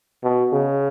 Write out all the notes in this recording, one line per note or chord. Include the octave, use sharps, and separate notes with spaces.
B2
C#3